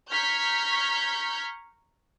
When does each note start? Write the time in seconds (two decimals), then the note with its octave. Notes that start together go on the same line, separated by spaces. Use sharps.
0.11 A#5 C#6 F6 G6 G#6 B6